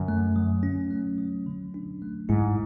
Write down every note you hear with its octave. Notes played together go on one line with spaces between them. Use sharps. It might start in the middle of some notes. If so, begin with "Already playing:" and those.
Already playing: F#2 D3
A3
F#3
C#4
A3
F#3
D3
D4
A3
G#2 E4